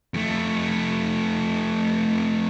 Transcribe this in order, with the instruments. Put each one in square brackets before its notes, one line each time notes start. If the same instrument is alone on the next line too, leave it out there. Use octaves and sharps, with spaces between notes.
[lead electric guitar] F2 A3